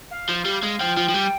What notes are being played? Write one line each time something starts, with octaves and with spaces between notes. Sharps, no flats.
F5
F3
G3
G#3
F3 G5
F3
F3
G3